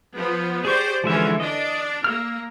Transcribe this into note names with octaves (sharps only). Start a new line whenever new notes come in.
F3 B3
G4 G#4 C5 D5 C#6
D3 E3 F3 G#3 C#4 E5
D4 D5 D#5
A#3 E6 F6